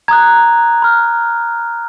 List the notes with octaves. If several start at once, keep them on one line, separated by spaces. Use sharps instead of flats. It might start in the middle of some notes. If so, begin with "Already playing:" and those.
A#5 D#6 F#6 G#6
B5 F6